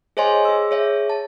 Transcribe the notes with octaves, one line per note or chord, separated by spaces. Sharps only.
G#4 C5 C#5 D#5 G#5 C6
G#4 E6
G#4 C#5 E5
A5